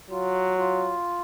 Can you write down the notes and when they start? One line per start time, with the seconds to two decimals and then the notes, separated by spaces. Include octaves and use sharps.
0.10 F#3 F4
0.58 F4